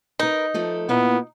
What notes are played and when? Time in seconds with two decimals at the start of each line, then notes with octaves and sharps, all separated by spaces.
0.19 D#4 A#4 B4
0.54 F3 A3 A4
0.89 A#2 A#3 B3 E4